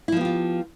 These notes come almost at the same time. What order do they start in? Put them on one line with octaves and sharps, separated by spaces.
E4 F3 B3 G4 F4